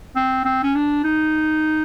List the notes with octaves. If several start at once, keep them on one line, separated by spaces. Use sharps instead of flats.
C4
C4
C#4
D4
D#4